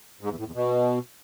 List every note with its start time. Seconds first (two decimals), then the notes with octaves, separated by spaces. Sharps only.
0.21 G#2
0.29 E2
0.38 A2
0.46 E2
0.54 B2